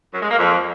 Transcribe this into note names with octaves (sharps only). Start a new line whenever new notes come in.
F#2
G#3
A#3
F2